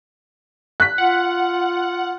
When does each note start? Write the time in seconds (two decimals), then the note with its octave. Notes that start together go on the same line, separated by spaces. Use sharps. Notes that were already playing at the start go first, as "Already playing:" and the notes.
0.80 F#6 B6
0.98 F4 F#5